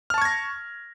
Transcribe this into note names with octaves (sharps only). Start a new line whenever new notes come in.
A5 C#6 F6 G#6 A#6